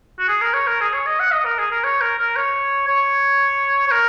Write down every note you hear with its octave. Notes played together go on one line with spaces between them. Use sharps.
F#4
G#4
A#4
C#5
A#4
G#4
C#5
D#5
F#5
D#5
A#4
G#4
A#4
C#5
A#4
A#4
C#5
C#5
C#5
A#4